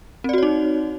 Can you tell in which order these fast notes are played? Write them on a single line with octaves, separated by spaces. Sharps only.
C4 D5 F#4 C#5 D#4